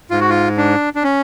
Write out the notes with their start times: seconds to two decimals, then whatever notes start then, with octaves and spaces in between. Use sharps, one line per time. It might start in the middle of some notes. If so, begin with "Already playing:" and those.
0.10 G#2 F4
0.21 F#4
0.29 F4
0.57 D4
0.95 D4
1.04 C#4